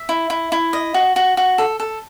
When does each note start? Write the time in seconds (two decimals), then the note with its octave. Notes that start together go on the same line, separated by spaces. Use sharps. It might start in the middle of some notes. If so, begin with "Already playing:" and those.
Already playing: E5
0.09 E4
0.30 E4
0.52 E4
0.73 D#5
0.94 F#4
1.16 F#4
1.37 F#4
1.58 A4
1.80 A4